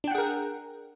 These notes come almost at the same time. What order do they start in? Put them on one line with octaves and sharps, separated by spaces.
D4 G5 F#5 G#4 A#4